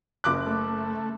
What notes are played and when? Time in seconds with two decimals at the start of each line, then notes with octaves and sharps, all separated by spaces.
0.24 F#1 D6 F#6
0.46 A3